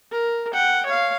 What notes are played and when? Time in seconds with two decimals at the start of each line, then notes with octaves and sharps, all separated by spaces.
0.11 A#4
0.54 F#5 G5
0.86 C#5 F5